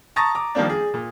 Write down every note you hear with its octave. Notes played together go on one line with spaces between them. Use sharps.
A5 A#5 C#6 D#6 A6 A#6
A#5 D6
D#3 F3 G3 A#3 C4 D4
G#4
A#2